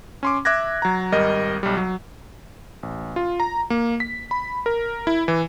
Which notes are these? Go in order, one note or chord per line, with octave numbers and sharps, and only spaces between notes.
C#4 C6 D6
E5 D6 F#6 G#6 A#6
F#3 A#5
G#1 G3 A#4 D#5
B1 G3
F#3
A1
F4
A#5
A#3
B6
B5
A#4
E4
E3